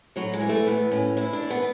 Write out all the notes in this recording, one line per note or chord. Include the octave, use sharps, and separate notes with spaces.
A2 F#3
G#3
E3
A3
A2 B3
A2 C#4
A2 E4
D4
E3
B3